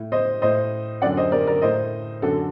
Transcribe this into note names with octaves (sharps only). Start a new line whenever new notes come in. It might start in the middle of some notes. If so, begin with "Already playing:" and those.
Already playing: A2
C5 D#5
A2 C5 D#5
F#2 D3 D5 F#5
C5 D#5
A#4 D5
A#4 D5
A2 C5 D#5
F#2 D3 F#4 A4